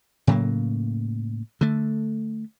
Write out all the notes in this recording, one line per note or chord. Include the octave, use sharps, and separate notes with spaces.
A2 C#3 F#3 A#3
D3 A3